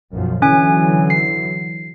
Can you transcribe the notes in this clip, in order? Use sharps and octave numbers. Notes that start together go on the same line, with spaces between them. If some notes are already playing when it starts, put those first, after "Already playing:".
B1 F#2 F3
D3 E3 F#3 C#4 G#5
C7